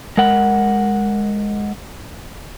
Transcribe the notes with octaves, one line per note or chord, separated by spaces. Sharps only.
G#3 A#4 F#5